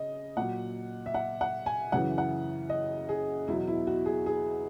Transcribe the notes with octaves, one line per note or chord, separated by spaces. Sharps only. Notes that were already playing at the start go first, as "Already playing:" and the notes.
Already playing: C#3 D#5
A#2 F#3 F#5
E5
F#5
F#5
G#5
F#2 C#3 E3 F#5
F#5
D#5
G#4
E2 B2 F#3 E4
E4
F#4
G#4
G#4